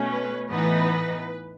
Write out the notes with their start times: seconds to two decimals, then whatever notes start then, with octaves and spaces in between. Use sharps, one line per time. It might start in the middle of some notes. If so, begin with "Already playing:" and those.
Already playing: B2 A3 C#4
0.11 B4
0.50 A2 E3 B3 D#4 B4